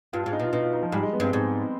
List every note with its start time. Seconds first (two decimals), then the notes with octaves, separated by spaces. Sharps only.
0.13 G2 F4
0.24 F4
0.26 G#2
0.33 D#4
0.40 B2 F4
0.53 B2 D#4
0.63 F4
0.73 D#4
0.83 F3
0.92 G#2 G3
1.03 G#3
1.13 B3
1.20 G2 C4
1.33 G#2